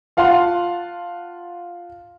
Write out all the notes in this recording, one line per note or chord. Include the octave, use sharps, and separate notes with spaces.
F4 F5 F#5 A5 C6